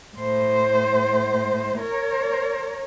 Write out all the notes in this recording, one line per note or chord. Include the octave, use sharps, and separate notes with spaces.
A2 C5
A#4 C#5